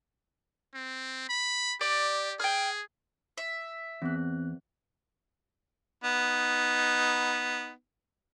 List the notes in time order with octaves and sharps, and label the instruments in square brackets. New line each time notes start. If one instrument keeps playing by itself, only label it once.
[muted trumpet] C4
B5
[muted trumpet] G4 [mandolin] D5
[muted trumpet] G#4 [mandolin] G5 F6
[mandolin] E5
[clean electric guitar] E2 [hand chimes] C4 F#6
[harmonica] B3 D#4